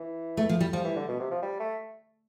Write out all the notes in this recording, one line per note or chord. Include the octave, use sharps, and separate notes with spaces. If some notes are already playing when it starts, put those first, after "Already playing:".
Already playing: E3
A3
F3
G3
F3 G3
E3
D3
B2
C3
F3
G3
A3